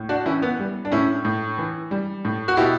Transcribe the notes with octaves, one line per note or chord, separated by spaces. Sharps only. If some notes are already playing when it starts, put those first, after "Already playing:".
Already playing: A2
D4 F#4
E3 C#4 E4
B3
G3
D4
A2 C#4 E4
A2
E3
G3
A2
F#4
B2 E4 G4